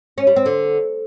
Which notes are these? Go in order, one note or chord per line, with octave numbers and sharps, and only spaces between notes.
C#4
G3
C4
D3